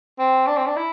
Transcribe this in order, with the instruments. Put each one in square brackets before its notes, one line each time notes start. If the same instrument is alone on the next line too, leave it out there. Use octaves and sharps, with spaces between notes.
[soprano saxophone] C4
D4
C4
D4
E4